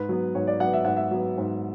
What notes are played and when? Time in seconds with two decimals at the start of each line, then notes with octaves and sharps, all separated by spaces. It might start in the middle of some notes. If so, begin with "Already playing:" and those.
Already playing: G#2 B4
0.09 F#3 B3
0.35 G#2 C#5
0.47 D5
0.60 F#3 B3 F#5
0.73 E5
0.85 G#2 F#5
0.97 E5
1.11 F#3 B3
1.37 G#2